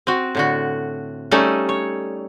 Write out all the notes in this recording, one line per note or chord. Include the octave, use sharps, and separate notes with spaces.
C4 F#4
A2 D3 F#4
G3 A3 C#4 D#4 A4
C#5